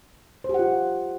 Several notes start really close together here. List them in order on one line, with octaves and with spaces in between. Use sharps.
C5 G4 F#5 F4